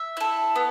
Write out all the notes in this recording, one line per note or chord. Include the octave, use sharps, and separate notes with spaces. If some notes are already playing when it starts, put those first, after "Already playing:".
Already playing: E5
E4 A4
B3